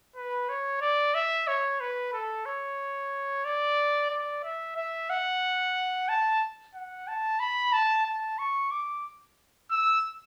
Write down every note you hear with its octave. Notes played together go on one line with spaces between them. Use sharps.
B4
C#5
D5
E5
C#5
B4
A4
C#5
D5
D5
E5
E5
F#5
A5
F#5
A5
B5
A5
A5
C#6
D6
E6